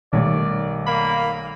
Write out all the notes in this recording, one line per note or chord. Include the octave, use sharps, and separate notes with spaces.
B1 D#3 G3 A3 C#5 D5
A#3 B5